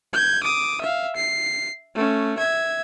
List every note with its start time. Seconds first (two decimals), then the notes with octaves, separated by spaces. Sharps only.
0.13 G6 G#6
0.43 D6 D#6
0.81 E5 F5
1.16 C7
1.95 A3 C#4
2.37 E5 G#6